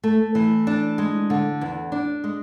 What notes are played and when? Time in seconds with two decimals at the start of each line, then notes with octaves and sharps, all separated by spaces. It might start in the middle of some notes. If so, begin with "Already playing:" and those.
0.04 A3
0.35 E3
0.67 D4
0.98 G#3
1.30 D3
1.61 E2
1.92 D4
2.24 G#3